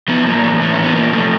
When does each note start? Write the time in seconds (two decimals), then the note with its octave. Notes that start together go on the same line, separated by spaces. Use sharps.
0.08 F3 B3
0.26 A2 A#3
0.44 E3
0.61 A2 A3
0.73 C#4
0.78 E3
0.84 B3
0.95 A#2 A#3
1.13 F3 A3